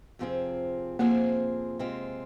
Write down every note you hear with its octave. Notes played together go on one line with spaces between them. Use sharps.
F2 C3 F3 C4 G#4
F2 C3 F3 A#3 C4 G#4
C3 G#3 C4 F4